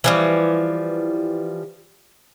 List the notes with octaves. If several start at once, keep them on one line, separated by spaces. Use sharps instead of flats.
E3 F3 G3